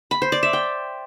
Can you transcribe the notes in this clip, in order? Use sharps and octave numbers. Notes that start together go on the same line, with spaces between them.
B5
C5
D5
E5
G5